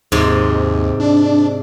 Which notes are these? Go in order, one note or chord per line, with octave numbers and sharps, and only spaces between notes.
D#2 G#2 C3
D4